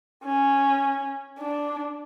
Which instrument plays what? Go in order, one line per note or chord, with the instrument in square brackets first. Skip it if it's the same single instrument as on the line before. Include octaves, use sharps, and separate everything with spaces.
[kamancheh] C#4
D4